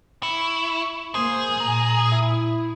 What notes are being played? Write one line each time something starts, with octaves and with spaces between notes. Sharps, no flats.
E4 C#6
A#3 G#4 C5
A#2 A#5
E4